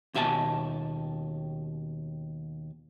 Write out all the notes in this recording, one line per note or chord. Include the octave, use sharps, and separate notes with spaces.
D#2 B2 E5 G#5 A5